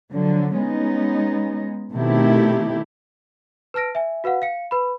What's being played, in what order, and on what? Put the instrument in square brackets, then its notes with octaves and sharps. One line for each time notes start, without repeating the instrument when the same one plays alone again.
[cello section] D3 F3 F#3
G#3 B3 C#4 D#4
B2 D#3 A3 C4 E4 G4
[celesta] B4 A5 F6 A#6 D7
E5 G#5
F#4 B4 F5 F#5
F5 C#7
B4 B5